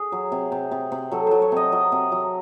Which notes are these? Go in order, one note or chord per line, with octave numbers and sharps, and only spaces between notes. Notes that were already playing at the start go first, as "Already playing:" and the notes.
Already playing: G#4
F#3
C3
C3
C3
C3
F#3 A4
F#3 C5
C#5
C3 D#5
F#3 D#5
C3
F#3